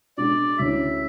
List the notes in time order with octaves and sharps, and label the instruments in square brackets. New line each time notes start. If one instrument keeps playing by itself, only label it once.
[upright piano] B2 G#3 D4 F#4 [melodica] D5
[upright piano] D2 D3 G#3 C#4 E4 [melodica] E5